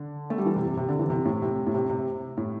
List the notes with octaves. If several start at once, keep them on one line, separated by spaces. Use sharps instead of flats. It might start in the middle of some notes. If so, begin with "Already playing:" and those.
Already playing: D3
A3
G3
E3
C3
C3
C3
D3
E3
C3
A2
C3
A2
C3
C3
A2